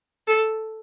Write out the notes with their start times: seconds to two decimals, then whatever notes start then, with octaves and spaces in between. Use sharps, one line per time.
0.27 A4